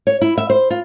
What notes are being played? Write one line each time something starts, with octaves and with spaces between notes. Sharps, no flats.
C#5
E4
E5
C5
F4